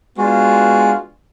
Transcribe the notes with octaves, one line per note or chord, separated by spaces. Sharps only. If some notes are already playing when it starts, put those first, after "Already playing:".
G#3 B3 D4 F4 F#4